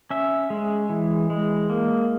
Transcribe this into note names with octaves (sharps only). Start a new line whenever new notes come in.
C#4 E5
G#3
E3
G#3
A#3